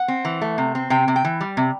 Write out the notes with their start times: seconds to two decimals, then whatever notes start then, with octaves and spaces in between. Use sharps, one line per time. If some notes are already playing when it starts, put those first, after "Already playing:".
Already playing: F#5
0.08 C4
0.25 E3
0.41 A3
0.58 C3
0.75 C4
0.90 C3 G5
1.08 C3
1.16 G5
1.25 E3
1.41 G3
1.57 C3